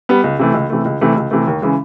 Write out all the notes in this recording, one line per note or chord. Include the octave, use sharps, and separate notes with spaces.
G3 B3
C#2
C3 E3 A3
C#2
C3 E3 A3
C#2
C3 E3 A3
C#2
C3 E3 A3
D#2
C#3 E3 G#3